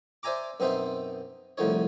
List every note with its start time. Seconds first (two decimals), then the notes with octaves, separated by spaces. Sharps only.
0.23 C5 D5 E5 G#5 A#5 D6
0.60 F#2 B2 C4 D#4 C5 E5
1.58 C2 A2 D3 F3 D#4 C#5